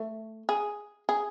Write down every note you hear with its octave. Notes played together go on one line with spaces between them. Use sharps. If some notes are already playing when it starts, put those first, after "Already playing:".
Already playing: A3
G#4
G#4